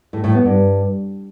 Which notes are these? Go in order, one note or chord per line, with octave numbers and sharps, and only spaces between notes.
A2
A2
B3
G2